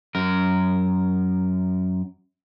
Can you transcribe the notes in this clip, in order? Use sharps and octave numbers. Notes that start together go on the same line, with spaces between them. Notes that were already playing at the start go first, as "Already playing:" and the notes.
F#2 A#4